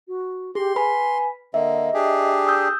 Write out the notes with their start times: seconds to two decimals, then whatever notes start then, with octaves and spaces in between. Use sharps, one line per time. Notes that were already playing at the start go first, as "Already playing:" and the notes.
0.08 F#4
0.55 G4 G#4 C6
0.76 B4 G#5 B5 B6
1.54 D3 A#3 D#5 E5
1.94 D4 G4 G#4
2.47 D#6 E6 G6